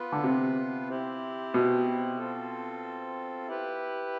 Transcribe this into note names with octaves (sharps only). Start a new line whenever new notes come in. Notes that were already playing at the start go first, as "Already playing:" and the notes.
Already playing: B3 F4 B4
D3
C3
C4 E4 G4
B2
C4 F4 A4
E4 G4 B4